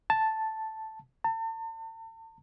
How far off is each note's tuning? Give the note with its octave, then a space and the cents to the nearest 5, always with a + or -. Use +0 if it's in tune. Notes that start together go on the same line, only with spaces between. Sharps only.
A5 +0
A5 +40